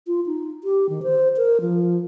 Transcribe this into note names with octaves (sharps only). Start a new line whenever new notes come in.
F4
D#4
G4
D#3
C5
A#4
F3